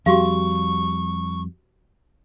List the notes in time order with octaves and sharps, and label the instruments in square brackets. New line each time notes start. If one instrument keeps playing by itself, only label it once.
[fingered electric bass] F2 G3 [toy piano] F#4 G4 F5 [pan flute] C#6